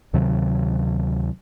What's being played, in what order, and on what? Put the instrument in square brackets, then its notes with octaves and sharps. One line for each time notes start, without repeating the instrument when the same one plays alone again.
[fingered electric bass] D2 C3 D#3 F#3